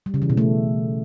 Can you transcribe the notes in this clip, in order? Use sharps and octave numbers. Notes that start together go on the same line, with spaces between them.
G3
C#3
E3
B2
A3